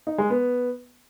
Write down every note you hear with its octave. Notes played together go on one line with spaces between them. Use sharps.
D#4
G#3
B3